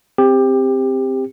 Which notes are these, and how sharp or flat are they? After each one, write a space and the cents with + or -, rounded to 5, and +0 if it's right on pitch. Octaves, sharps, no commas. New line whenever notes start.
C4 +0 G4 +20